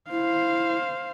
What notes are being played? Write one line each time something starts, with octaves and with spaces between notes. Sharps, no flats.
E4 C5 F5